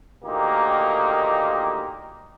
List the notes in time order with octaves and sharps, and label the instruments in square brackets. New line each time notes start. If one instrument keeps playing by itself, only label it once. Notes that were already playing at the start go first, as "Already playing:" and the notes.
[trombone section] D2 A#2 D#3 A#3 D#4 G4